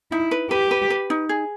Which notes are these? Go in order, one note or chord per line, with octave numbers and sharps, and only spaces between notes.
D#4 E4
B4
G4 B4
B4
B4
D#4
G#4